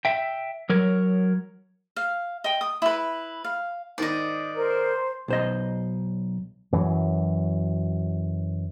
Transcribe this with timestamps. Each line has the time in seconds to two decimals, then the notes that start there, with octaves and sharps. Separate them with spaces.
0.05 E5 G5
0.69 F#3 A#4 C#5
1.96 F5
2.44 D#5 G5
2.61 D#6
2.82 E4 B4
3.44 F5
3.98 G#2 D#3 D5 D#5
4.56 A#4 C5
5.28 B1 C5 D#5
6.72 F#2 E3 F#3